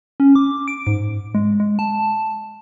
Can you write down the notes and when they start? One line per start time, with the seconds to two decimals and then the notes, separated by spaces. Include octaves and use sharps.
0.20 C#4
0.35 D6
0.68 D7
0.87 G#2
1.35 G#3
1.60 G#3
1.79 A5